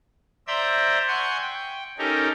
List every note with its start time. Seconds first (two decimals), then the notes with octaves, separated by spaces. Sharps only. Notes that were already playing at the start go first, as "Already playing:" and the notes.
0.47 C5 D5 E5 A#5 E6 G6
1.08 F#5 G#5 C6 C#6 G6 G#6
1.42 G5
1.98 C#4 D#4 G4 A4 A#4